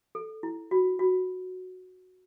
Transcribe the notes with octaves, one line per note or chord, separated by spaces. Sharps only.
A4
E4
F#4
F#4